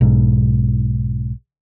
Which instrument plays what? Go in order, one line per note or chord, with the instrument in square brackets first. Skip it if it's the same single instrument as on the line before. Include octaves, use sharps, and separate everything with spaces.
[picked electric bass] B1 G#2